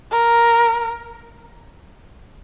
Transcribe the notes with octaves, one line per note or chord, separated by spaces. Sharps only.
A#4